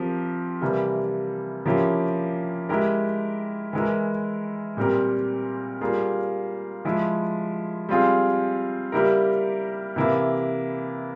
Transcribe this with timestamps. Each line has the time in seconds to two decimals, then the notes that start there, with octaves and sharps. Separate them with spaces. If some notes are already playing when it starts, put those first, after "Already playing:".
Already playing: F3 C4 G4 A#4
0.61 C3 E3 G3 A#3
1.65 F3 A#3 C#4 E4 G4
2.69 G#3 E4 G4 A#4
3.73 E3 G#3 E4 A#4
4.77 A#2 G3 C4 G4 A#4
5.81 G3 A#3 F4 G#4
6.85 F3 G#3 E4
7.89 G3 C4 F4 G#4
8.92 G3 A#3 E4 G4 A#4
9.96 C3 E3 A#3 E4